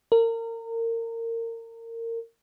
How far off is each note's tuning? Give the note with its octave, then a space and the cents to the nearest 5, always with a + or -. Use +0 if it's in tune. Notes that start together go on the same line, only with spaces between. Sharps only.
A#4 -30